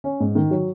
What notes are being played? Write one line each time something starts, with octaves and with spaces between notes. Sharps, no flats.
C#4
G#2
D#3
F#3